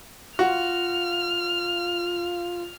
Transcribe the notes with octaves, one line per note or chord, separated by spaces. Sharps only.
F4 F#4 F6